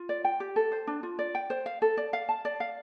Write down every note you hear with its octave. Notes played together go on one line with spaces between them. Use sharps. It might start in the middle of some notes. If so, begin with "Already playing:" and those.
Already playing: F4
D5
G5
G4
A4
C5
D4
F4
D5
G5
C5
F5
A4
D5
F5
A5
D5
F5